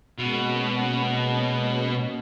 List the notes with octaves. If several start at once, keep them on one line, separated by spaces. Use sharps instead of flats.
B2 G#3 A#3 C#4